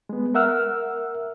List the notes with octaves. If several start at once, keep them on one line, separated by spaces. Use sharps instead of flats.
G#3 B3
A#4 E5 F#5 E6 F6